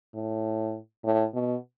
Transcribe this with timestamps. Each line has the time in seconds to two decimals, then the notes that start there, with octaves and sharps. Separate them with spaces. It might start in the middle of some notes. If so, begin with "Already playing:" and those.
0.14 A2
1.04 A2
1.34 B2